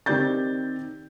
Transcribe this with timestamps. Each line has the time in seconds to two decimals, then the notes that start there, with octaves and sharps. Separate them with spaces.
0.06 D#3 C4 G4 D5 G6 A6